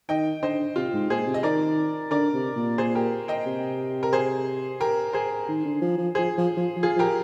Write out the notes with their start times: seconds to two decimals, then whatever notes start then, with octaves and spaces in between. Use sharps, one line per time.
0.09 D#3 D#5 G5
0.43 D3 C5 D#5
0.76 C3 F4
0.93 G#2
1.10 A#2 G#4 C5
1.27 C3
1.34 D#5
1.43 D#3 A#4 D5
2.11 D3 A#4 D5
2.34 C3
2.56 A#2
2.78 G#4 C5
2.95 G4 A#4
3.28 D#5 G5
3.46 C3
4.03 A#4
4.13 G#4 C5
4.80 G4 A#4
5.13 G#4 C5
5.48 D#3
5.65 D3
5.81 F3
5.98 F3
6.15 F3 G#4 C5
6.37 F3
6.57 F3
6.76 F3
6.83 F4 G#4
6.96 F3 G4 A#4